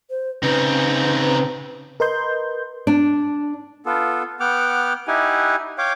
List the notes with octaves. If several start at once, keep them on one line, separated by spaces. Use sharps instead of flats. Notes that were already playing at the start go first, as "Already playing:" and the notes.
C5
C#3 C4 D#4 B4
A#4 B4 D#5 C6 G6
D4
B3 F4 A4
B3 F#5 G5 D6 F6
D#4 E4 G4 F#5 G#5
C#5 F5 G5 D6